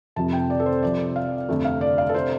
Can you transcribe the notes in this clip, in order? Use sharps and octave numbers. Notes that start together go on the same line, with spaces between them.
F1 F2 C3 F3 A5
G5
D5
A4
C5
C2 C3 F3 D5
F5
G1 F2 C3 A3
F5
D5
F5
A4
C3 C5